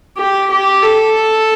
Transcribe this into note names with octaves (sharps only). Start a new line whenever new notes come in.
G4
G4
A4